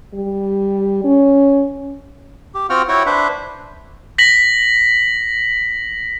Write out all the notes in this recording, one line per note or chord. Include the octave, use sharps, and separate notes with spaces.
G3
C#4
G4
C4 F4 F#4 F#5 G5 F6
E4 F#4 C#5 F#5 G5
D4 B4 C5 E5
A#6 B6 F#7